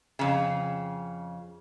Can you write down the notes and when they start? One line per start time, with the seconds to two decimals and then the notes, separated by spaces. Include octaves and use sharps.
0.19 F2 C#3